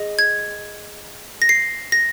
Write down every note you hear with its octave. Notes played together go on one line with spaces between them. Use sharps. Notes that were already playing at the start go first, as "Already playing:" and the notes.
Already playing: G#4 D#5
G#6
A#6
C7
A#6